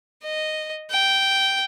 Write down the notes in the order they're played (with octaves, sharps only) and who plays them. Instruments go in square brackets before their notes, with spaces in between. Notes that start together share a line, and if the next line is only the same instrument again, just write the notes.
[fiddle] D#5
G5